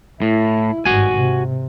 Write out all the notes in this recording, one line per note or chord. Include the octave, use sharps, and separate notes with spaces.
A2 E4
G#1 G2 F#4 G#5
C3